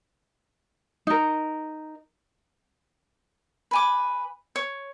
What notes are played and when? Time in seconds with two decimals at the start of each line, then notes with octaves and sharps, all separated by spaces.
1.07 D#4 A#4
3.71 B4 G#5 D6
4.56 C#5